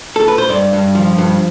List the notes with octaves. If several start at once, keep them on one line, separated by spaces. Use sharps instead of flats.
A4
B4
C5
G2 D5
G2
F3
G2